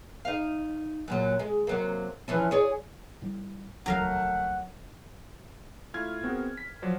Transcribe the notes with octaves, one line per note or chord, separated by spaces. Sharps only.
D#4 F5
F#2 A#2 F#3
G#3
C3 F#3 A#3
E3 F3 C#4
G#4 C#5 D5
A2 G3
D#1 C#2 F#3 A3 A#4 F5 F#5
A3 E4 F4 F6 G#6
B3 C4 F#4 G#4 A#4
B6
F3 F#3 C5 D5